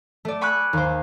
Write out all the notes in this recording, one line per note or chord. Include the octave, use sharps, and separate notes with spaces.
A3 D5
G#5 B5 C#6 D6 E6 F#6
D#2 C5